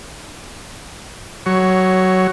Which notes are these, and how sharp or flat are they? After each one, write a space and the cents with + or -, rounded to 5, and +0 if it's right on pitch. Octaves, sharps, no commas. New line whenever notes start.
F#3 +15 C#5 +0